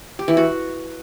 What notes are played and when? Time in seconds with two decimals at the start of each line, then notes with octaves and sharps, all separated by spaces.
0.19 G4
0.28 E3
0.37 F#4